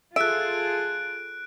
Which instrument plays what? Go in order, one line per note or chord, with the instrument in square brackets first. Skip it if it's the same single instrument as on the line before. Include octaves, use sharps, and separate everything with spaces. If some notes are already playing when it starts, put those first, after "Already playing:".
[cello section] F4 G#4 A4 [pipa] E5 [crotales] F#6 D7